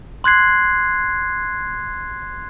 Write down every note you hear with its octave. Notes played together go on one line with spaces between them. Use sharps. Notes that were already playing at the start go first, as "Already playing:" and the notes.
C6 F#6 G#6 C7